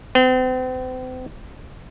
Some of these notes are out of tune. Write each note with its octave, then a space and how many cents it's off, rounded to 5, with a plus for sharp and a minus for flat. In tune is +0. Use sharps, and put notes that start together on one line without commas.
C4 -40